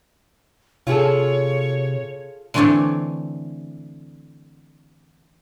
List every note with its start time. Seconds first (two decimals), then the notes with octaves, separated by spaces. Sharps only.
0.87 C3 F4 G#4 A4 C#5
2.54 D3 E3 A3 C4 D4 C#5